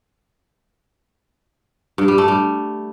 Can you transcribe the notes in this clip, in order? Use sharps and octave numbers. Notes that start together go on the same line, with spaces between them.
G2
G3
A3
G3